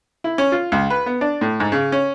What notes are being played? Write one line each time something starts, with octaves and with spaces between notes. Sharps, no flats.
E4
C#4
F4
C#2
B4
B3
D4
A2
G#2
C#3
C#4